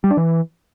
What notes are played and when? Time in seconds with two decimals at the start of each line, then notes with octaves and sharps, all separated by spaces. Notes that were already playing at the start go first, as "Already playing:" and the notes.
0.04 G3
0.10 D4
0.17 E3